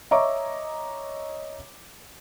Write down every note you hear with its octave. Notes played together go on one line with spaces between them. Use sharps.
C#5 D#5 E5 A#5 C#6 D6